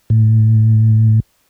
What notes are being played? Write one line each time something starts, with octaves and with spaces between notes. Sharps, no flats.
A2